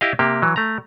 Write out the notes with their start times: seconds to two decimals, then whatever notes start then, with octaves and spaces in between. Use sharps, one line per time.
0.01 E4 G4 D#5 F5
0.19 C3 A#3 G4
0.42 E3 F#3
0.56 A3 A#5